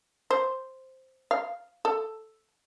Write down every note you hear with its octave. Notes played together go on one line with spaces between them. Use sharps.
C5
F5
A4